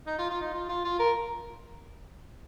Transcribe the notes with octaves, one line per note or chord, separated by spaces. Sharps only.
D#4
F4
F4
D#4
F4
F4
F4
A#4